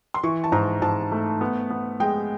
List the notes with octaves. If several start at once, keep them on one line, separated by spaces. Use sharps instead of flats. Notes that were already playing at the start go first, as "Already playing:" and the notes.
C6
E3 C#6
A5
G#2 A#5
G#2 A5
A3
B3
B3
G#3 G5